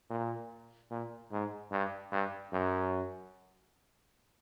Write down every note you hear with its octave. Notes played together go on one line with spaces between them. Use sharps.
A#2
A#2
G#2
G2
G2
F#2